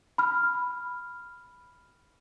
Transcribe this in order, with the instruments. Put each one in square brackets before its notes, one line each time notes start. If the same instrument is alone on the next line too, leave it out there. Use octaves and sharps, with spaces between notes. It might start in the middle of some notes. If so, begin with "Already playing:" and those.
[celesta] B5 F6